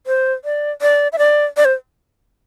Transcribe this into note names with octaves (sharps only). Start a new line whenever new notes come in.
C5
D5
D5
E5
D5
D5
C5